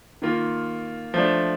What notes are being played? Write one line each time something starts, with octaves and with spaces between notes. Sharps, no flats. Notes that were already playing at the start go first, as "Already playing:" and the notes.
D#3 A#3 F4
F3 A3 D4